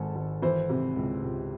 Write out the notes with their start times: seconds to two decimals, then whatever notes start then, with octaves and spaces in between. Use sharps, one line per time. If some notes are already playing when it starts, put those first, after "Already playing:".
Already playing: G#1 G#2 A4 G#5
0.16 G#1
0.42 E3 C5
0.70 C3
0.97 C#2
1.24 C#2